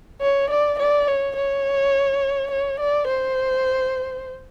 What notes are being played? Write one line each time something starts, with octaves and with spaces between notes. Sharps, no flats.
C#5
D5
D5
C#5
C#5
C#5
D5
C5